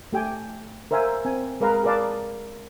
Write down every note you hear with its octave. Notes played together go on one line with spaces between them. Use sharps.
A3 G4 G5 G#5
A#4 C5 E5 F5 G#5
C4 G#5
G#3 G#4 A#4 B4 F5 A#5
G#4 A#4 B4 D5 F5 A5